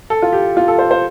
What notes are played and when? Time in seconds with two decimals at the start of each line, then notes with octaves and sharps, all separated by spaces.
0.10 A4
0.22 F4
0.33 G4
0.57 F4
0.68 A4
0.79 C5
0.91 C5